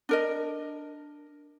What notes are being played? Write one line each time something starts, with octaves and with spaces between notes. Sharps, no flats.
D4 A#4 D#5